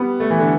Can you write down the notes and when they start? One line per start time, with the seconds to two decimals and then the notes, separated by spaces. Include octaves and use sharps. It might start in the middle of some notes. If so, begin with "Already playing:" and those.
Already playing: G3 B3
0.20 A3
0.30 E3
0.39 D3